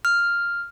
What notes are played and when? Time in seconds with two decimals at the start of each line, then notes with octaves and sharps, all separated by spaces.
0.05 F6